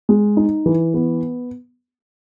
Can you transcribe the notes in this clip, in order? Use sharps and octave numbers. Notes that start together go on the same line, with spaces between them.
G#3
D#4
E3
B3